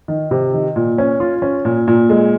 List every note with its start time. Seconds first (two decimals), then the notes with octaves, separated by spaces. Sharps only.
0.08 D#3
0.31 C3
0.53 D#3
0.76 A#2
0.98 C#4
1.20 F4
1.42 C#4
1.65 A#2
1.88 A#2
2.10 G#3